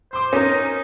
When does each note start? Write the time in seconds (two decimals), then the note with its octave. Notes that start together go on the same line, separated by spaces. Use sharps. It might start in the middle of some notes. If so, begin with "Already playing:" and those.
0.13 C5 C6 D6
0.33 C#4 D#4 A#4